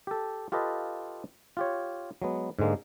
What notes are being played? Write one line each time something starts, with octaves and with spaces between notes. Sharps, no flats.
G4 A4
F4 G4 A4 B4 D#5 F5
F4 G4 C#5
F#3 G#3 B3
G#2 D3 G#3 A#3